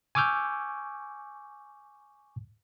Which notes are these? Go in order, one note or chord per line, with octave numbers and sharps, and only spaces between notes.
G#5 C#6 D6 E6 F6 G6